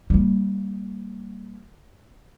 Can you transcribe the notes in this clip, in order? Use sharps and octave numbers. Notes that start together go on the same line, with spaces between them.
G3 A#3